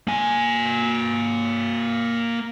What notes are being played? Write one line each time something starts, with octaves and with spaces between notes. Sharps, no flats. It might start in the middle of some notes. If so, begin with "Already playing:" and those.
A#3 G#5